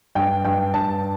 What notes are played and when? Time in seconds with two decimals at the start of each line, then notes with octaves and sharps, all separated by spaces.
0.15 G2 G5
0.45 G2 G5
0.74 G2 A5